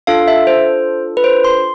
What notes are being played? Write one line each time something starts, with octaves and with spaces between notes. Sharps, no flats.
D4 F4 A4 F5
E5
C5
B4
C5
C6